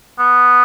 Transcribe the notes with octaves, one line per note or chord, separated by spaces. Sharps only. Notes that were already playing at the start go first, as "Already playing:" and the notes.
B3